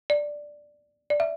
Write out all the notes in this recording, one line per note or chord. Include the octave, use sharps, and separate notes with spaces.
D5
D5
E5